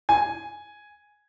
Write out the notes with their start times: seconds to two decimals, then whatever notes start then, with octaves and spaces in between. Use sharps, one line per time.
0.09 G#5